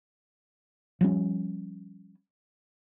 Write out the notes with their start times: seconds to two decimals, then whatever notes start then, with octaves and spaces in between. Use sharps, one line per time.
1.01 F3 G3 C#4